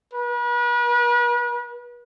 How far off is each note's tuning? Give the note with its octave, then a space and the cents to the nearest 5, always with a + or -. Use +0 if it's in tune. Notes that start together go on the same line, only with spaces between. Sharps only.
B4 -40